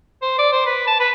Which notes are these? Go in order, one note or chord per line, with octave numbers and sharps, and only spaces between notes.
C5
D5
C5
B4
A5
B4